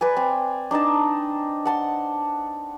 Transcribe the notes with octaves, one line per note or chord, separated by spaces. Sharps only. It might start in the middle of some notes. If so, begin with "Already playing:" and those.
B4 D5 G#5
C4
D4 D#4 D#5 A5
F#5 A5 C6